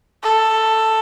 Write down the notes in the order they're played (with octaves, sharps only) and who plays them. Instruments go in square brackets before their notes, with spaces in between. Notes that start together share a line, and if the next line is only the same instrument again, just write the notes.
[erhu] A4